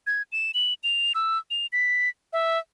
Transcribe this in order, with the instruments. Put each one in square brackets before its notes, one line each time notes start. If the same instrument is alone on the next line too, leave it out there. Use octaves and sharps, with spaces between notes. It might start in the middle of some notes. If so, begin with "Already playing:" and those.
[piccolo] G#6
E7
F#7
F7
E6
F7
B6
E5